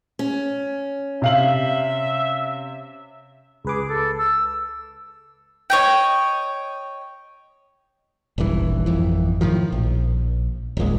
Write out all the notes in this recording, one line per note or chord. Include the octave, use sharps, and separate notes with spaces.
C#4
C3 E5 F5 F#7
C#2 G#4 B4 D6
A4
E6
C#5 D#5 G5
D#1 G#1 G2 E3
G#1 F2 E3
A2 C3 D#3 F3
A#1
D#1 G#1 A#2 G#3